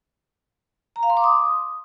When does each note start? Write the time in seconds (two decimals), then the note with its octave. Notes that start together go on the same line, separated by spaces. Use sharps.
0.96 A#5
1.03 F5
1.10 C6
1.17 D6
1.24 D#6